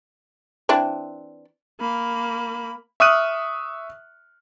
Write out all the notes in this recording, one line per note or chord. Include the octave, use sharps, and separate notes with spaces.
E3 C4 D4
A#3 B5
E5 C#6 D#6 F6 F#6 D#7